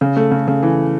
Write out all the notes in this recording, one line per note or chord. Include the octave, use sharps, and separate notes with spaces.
C#3
A3
C#3
C#3
E3